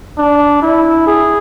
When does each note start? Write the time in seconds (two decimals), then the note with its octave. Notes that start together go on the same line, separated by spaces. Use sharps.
0.18 D4
0.62 E4
1.07 G#4